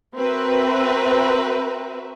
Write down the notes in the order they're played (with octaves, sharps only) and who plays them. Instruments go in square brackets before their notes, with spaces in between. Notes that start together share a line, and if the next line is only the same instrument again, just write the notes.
[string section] C4 F#4 A#4 B4 E5